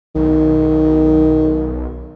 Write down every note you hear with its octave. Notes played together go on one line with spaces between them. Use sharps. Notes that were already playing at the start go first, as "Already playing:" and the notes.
B1 D#3